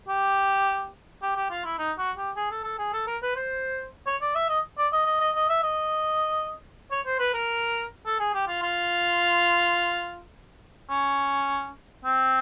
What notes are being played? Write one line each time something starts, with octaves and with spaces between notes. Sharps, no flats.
G4
G4
G4
F4
E4
D#4
F#4
G4
G#4
A4
A4
G#4
A4
A#4
B4
C5
C#5
D5
E5
D#5
D5
D#5
D#5
D#5
D#5
E5
D#5
C#5
C5
B4
A#4
A4
G#4
G4
F4
F4
C#4
C4